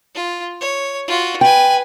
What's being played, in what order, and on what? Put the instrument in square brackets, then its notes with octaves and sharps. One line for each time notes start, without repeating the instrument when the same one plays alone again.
[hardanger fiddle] F4
C#5
F4 F#4
[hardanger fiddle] B4 G#5 [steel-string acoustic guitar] G5